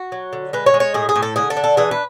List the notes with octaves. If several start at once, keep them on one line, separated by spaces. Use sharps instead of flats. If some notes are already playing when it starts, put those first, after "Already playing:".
Already playing: F#4
F#3
D3
G#3 B4
C#5
G#3
C#5
A2 G#4
G#4
A2
A4
D3 G#4
A4
D4
A4
E3 G#4
B4